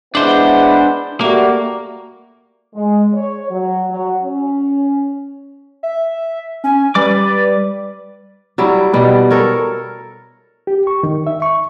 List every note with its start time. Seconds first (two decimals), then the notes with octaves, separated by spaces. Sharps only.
0.15 G#3 B3 D4 E4 C5
1.21 G3 A3 A#3 F#4
2.75 G#3
3.14 C#5
3.51 F#3
3.89 F#3
4.23 C#4
5.83 E5
6.64 C#4 G#5
6.95 G3 B4 D5 D6
8.58 F#3 G3 E4
8.94 B2 G3
9.30 A4 A#4 C#5
10.67 G4
10.87 C#6
11.03 D#3
11.27 E5
11.42 C#6